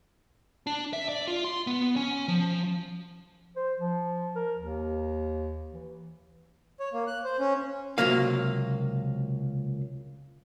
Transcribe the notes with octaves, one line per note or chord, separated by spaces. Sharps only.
D4
E5
D5
F4
C6
B3
C#4
F3
C5
F3
A#4
D#2
E3
C#5
A#3
F#6
C5
C#4
C#2 G#2 C3 F#3 A#3 F5